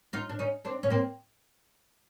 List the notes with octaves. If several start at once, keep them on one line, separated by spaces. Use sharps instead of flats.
D#4 F4
D4
C#4 D#4
C4 D4
C#4
A#3 C4